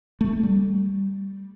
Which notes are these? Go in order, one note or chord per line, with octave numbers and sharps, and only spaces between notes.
A3
G3